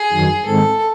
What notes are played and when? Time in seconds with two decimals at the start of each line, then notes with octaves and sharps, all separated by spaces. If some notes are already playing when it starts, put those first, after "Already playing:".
Already playing: G#4
0.12 F#2 D#3 F#3
0.45 G#2 D#3 G#3 C4 A4